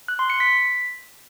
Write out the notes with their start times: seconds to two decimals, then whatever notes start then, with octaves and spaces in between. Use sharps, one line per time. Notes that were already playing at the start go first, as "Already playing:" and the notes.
0.08 F#6
0.19 C6
0.30 C#7
0.40 B6